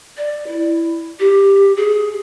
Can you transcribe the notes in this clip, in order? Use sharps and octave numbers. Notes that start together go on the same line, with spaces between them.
D5
E4
G4
G#4